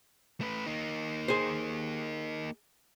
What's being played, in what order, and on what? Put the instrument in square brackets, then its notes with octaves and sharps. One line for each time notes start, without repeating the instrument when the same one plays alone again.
[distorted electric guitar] A3 B4
A#3 D#4
[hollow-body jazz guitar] G#4 C5